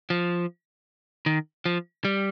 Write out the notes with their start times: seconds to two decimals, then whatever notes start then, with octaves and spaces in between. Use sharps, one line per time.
0.10 F3
1.26 D#3
1.66 F3
2.05 G3